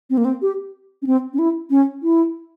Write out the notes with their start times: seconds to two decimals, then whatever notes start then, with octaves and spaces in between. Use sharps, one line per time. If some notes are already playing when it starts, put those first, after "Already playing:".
0.10 C4
0.17 A#3
0.25 C4
0.42 G4
1.02 C#4
1.07 C4
1.33 C#4
1.39 E4
1.70 C#4
2.03 E4